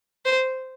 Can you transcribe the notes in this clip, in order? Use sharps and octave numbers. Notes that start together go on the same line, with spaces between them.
C5